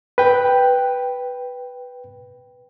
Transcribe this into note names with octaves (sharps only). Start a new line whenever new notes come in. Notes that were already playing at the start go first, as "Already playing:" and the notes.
B4 G5